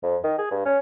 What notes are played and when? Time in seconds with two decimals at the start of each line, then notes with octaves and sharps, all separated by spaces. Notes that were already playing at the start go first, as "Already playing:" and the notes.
0.03 F2
0.24 D#3
0.38 G#4
0.51 G2
0.66 C#4